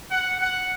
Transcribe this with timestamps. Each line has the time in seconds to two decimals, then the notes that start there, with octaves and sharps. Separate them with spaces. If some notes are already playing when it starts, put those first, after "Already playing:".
0.11 F#5
0.41 F#5